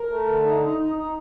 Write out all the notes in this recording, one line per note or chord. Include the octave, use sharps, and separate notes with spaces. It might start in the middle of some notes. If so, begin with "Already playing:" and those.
Already playing: A#4
A3
D3
D#4
D#4
D#4
D#4